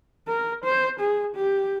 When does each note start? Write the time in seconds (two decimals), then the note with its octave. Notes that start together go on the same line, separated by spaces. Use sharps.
0.28 A#4
0.64 C5
1.00 G#4
1.35 G4